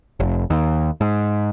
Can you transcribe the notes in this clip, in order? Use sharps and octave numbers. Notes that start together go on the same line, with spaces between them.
F1
D#2
G#2